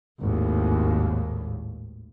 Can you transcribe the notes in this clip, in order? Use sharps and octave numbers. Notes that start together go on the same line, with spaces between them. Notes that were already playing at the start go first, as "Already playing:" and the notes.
G#1 D#2 A2